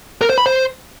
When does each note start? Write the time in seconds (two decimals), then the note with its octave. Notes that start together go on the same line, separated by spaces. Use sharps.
0.21 A#4
0.30 C5
0.38 B5
0.46 C5